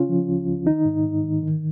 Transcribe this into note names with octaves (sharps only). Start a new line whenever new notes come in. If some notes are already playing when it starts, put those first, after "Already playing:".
Already playing: C#3 C#4 F4
F3
C#2
C#2
D#3 D#4
G#2
G#2
D#3
D#3